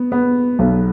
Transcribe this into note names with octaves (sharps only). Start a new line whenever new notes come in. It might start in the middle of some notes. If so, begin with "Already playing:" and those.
Already playing: B3
B3
B1